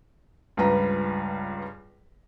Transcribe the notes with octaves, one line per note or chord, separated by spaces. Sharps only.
C#2 G2 F3 B4 A#5 A#6